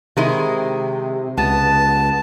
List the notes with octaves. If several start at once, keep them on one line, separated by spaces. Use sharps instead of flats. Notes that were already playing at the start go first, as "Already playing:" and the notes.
C3 D#3 G#3 E4
C#2 B3 A5